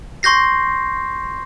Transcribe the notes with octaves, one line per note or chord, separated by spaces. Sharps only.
C6 C#6 G6 A#6 C7